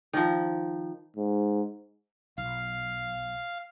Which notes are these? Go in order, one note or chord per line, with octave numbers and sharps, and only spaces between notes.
D#3 F3
G#2
B1 F5